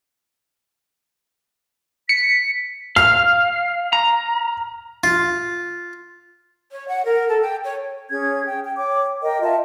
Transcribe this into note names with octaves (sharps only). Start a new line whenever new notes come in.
B6 C#7
F5 F6
A#5
F4
C#5
F#5
A#4
A4
G5
C#5
C#4 G#4 G#6
G5
G5
C#5 G5 D6
A#4 D#5 G5
F4 D#5 E5 A5